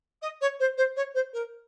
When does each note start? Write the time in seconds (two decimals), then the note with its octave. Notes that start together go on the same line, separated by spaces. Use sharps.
0.21 D#5
0.41 C#5
0.59 C5
0.77 C5
0.96 C#5
1.14 C5
1.33 A#4